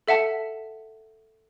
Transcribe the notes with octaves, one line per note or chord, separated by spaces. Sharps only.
A4 E5 F#5 A5